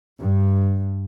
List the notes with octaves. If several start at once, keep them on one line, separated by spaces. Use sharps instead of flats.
G2